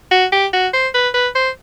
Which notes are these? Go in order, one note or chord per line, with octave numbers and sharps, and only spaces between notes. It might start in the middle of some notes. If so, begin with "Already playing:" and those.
F#4
G4
F#4
C5
B4
B4
C5